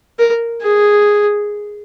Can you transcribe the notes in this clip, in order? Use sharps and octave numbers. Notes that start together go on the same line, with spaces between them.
A#4
G#4